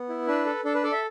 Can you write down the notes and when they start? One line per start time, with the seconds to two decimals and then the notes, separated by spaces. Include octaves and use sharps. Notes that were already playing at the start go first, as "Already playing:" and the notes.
Already playing: B3
0.09 E4
0.27 D4 B4
0.46 A4
0.64 D4 A4
0.74 B4
0.83 A4 D5
0.92 E5